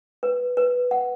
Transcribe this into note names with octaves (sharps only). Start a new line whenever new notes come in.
B4
B4
F#5